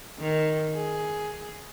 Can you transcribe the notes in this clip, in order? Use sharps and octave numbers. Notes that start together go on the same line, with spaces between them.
D#3
G#4